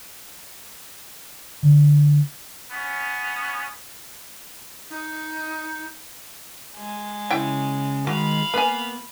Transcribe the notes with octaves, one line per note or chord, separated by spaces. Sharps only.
D3
B3 C#4
D#4
G#3
C#3 E4 G5 C#6
D#3 G#3 F#4 F5 B5
A#3 B3 B4 G#5